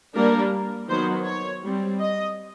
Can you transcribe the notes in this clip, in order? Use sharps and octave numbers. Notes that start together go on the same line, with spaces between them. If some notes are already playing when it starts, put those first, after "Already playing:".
G3 A#3 D4 A#4
D#3 F#3 B3 C5
C#5
G3 C4
D#5